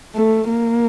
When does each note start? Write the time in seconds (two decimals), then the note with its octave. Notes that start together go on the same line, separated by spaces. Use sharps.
0.16 A3
0.49 A#3